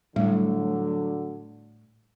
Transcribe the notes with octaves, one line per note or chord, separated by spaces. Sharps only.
A2 D3 F#3 G3